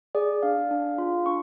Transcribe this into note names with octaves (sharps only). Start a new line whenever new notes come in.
G#4 D5
D4 F5
D4
F4
D4 C#6